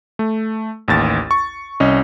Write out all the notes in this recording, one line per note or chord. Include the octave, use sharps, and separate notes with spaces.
A3
A1 D#2 A6
C#6
C2 C#4 D#5